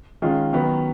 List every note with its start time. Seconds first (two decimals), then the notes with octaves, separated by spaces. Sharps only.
0.22 D#3 G#3 C#4 F4
0.53 D#3 F#3 B3